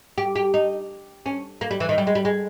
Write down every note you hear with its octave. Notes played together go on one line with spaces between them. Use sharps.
G4
G4
D#4
C#4
A#3
G3
E3
D#3
G3
G#3
G3
G#3